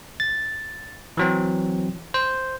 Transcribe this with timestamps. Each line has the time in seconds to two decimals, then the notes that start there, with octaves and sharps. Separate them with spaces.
0.20 A6
1.17 E3 F#3 C4
2.14 C5